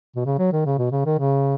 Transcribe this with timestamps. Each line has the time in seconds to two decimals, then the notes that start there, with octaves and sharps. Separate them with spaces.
0.16 B2
0.25 C#3
0.38 F#3
0.52 D#3
0.65 C#3
0.78 B2
0.91 C#3
1.05 D#3
1.18 C#3